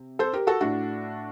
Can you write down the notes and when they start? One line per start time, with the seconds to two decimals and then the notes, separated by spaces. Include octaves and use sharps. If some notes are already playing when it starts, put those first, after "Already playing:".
Already playing: C3
0.19 A4 C5
0.33 G4 A#4
0.47 F#4 A4
0.61 A2 A3 D4 F#4